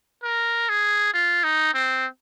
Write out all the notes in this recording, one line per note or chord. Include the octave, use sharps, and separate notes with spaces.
A#4
G#4
F4
D#4
C4